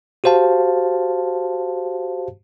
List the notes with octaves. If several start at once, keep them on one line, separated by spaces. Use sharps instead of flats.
F#4 G4 C5 F5 A5